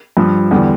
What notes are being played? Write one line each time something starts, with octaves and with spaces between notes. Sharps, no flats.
G2 F3
E2 D3 G3